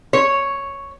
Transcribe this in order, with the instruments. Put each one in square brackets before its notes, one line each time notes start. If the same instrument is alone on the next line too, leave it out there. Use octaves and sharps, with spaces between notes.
[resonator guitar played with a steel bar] C#5